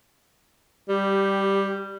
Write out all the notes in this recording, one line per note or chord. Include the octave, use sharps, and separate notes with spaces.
G3 G4